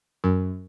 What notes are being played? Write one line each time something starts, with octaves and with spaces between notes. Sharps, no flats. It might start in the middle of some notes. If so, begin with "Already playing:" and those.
F#2